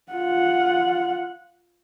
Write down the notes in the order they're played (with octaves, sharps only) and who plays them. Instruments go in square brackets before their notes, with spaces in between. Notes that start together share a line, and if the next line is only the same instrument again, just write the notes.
[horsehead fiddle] F4 F#5